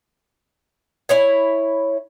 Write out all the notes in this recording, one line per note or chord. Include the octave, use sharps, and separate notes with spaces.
E4 C#5 G#5